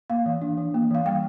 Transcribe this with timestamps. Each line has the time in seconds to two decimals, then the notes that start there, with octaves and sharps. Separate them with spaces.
0.10 A#3 F5
0.26 E3
0.42 D4
0.58 E3
0.75 A#3
0.90 E3 F5
1.05 G3 G5